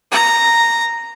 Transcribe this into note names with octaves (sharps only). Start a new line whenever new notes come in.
A#5